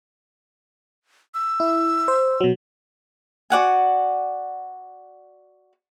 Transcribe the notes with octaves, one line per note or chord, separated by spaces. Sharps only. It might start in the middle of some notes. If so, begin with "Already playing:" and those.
E6
E4
C5
B2 F#3
F#4 D5 F#5 G#5